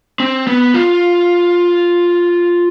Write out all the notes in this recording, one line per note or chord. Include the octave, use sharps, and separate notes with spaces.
C4
B3
F4